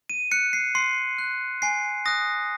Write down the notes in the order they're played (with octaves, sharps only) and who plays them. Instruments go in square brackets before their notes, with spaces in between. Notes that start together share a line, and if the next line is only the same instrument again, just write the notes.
[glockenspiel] D#7
F#6 C#7
C7
C6 C7
F#6
G#5 C7
D#6 F#6 A#6